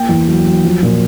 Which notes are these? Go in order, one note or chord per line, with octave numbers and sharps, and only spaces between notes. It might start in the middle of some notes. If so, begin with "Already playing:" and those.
Already playing: A#3 G5
E2
F#3
F#3
F3
A#2